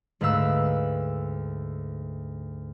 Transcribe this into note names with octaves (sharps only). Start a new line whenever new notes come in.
D2 G#2 B4 F5 E6 F#6